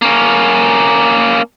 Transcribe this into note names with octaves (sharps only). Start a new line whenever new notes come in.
A#3 C#4